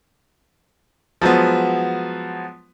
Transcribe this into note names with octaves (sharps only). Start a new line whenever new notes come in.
F3 F#3 G#3 B3